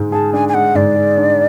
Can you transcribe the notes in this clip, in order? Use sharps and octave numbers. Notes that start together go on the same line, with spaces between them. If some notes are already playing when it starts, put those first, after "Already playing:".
Already playing: G#2 G#3
G#4 A5
D4 G#5
G#5
G#3 F#5
G#2 D5
G#4
D4